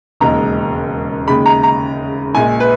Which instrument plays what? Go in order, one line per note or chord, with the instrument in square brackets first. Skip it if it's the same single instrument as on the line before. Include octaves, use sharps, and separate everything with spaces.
[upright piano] E1 D#2 C#3 G#3 A#5
D#2 C#3 G#3 B5
A#5
A#5
A#1 A#2 G#3 G#5
B4